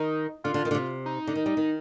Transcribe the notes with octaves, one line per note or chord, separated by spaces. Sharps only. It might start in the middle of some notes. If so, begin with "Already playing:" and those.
Already playing: D#3 D#4
D3 F4
D3
D#3
D3
C3
D#4
D3
D#3
G3
D#3